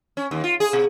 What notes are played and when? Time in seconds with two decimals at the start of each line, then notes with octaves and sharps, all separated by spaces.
0.17 C#4
0.31 D#2
0.44 F4
0.60 G#4
0.73 B2